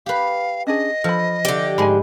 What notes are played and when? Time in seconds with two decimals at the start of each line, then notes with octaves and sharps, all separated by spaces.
0.06 G4 B4 F5
0.67 C#4 D4 G#4 D#5
1.04 F3 A4 B5
1.45 D3 G4 D5 E5
1.78 G#2 G#3 G#5 B5